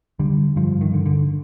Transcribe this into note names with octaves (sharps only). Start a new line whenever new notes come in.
D3 G3
G2 F3
D#3
D3
D3